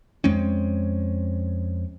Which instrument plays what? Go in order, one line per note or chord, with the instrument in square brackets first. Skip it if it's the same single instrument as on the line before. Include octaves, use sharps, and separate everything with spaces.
[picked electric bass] F2 G#3 C4 C#4